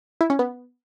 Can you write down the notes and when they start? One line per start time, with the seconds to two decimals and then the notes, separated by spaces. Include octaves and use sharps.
0.21 E4
0.30 C#4
0.39 B3